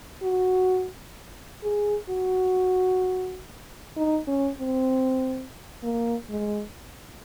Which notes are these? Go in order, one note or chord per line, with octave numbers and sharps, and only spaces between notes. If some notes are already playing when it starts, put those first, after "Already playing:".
F#4
G#4
F#4
D#4
C#4
C4
A#3
G#3